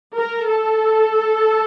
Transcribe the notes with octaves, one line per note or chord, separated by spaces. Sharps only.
A#4
A4